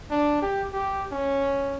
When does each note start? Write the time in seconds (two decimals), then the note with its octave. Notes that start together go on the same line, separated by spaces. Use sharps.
0.11 D4
0.42 G4
0.73 G4
1.12 C#4